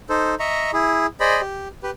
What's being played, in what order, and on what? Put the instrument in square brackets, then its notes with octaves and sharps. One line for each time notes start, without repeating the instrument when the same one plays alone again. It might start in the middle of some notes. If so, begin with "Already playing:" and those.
[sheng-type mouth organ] D#4 A4 C5
D#5 E5 A#5 C#6
E4 G#4
G#4 C5 D5 D#5 B5
G4
G4 B4